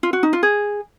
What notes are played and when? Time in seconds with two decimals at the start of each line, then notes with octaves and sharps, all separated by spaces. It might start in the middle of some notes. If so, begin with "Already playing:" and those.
0.03 F4
0.13 F#4
0.23 D#4
0.33 F4
0.43 G#4